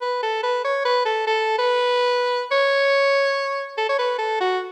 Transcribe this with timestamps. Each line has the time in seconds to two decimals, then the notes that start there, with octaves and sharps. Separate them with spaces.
0.01 B4
0.23 A4
0.43 B4
0.64 C#5
0.85 B4
1.05 A4
1.27 A4
1.58 B4
2.51 C#5
3.77 A4
3.89 C#5
3.99 B4
4.18 A4
4.40 F#4